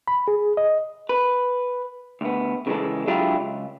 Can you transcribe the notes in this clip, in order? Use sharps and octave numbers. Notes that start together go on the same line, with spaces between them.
B5
G#4
D#5
B4
D2 B3
C#3 E3 G3 G#3 A4
F#3 G#3 D4 E4 F4 G4
C#2